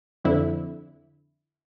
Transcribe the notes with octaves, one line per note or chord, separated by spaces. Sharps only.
F2 D3 E4